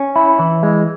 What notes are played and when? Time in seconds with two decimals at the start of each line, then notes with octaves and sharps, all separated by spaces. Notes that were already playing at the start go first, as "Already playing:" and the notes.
Already playing: C#4
0.16 E4
0.39 E3
0.63 G#3